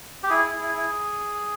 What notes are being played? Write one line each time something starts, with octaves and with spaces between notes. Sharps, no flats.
G4
E4 G#4
E4
E4
E4